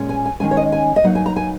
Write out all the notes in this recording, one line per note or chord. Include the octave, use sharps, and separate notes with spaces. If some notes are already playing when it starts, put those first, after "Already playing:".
Already playing: A#2 G#3 C#4
G#5
G#5
D#3 G#3 C#4 G#5
C#5
D#5
G#5
D#5
F#3 A#3 D#4 F#5
G#5
A#5
G#5